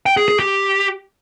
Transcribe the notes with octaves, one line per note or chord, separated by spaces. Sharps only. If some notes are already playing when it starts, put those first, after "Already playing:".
G5
G#4
G#4
G4